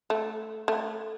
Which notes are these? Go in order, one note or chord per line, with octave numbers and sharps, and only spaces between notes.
A3
A3